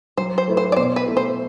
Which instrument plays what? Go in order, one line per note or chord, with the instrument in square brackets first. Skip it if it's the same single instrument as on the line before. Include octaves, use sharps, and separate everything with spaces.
[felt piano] F#3 [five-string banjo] C5
[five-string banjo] C5
[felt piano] A3 E4 B4
[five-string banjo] C5
D5
[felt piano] B2 [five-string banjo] C5
[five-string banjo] B4
[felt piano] A3 E4 A4
[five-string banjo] C5